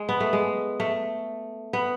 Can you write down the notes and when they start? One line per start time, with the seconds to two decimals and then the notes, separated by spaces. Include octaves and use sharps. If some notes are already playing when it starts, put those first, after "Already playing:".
Already playing: G#3
0.09 B3
0.20 A3
0.33 G#3
0.80 A3
1.73 B3